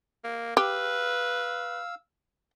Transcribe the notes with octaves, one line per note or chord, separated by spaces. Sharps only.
A#3
G4 B4 F5 E6